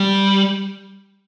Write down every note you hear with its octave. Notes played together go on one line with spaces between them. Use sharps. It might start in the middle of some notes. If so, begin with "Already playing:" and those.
Already playing: G3